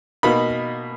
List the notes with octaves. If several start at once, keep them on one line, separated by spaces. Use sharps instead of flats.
B2 A#3 D#4 B5